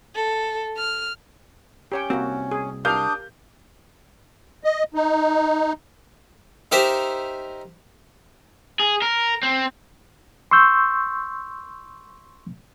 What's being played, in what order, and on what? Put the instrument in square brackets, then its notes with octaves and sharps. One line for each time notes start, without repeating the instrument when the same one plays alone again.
[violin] A4
F6
[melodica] C#4 [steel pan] G4 C#5 G5
[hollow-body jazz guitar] C2 C4 [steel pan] A#3 F#4
[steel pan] G#4
[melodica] D4 D6 D#6 [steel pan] G4 A#4 F5 [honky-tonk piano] G6
[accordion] D#5
D#4
[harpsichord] D#4 G4 A#4 C5 E5
[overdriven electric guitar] G#4
A#4
C4
[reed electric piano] C6 C#6 E6 G6